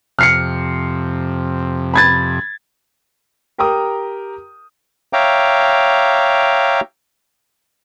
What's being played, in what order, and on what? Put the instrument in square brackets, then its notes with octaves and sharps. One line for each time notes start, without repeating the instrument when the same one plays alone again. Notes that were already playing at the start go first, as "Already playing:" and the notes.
[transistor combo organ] F2 C3 [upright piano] F6 C7 C#7
[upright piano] B5 G#6 A6
G4 A#4 G5 A#5 D#6
[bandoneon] C#5 E5 F5 G5 A#5 D6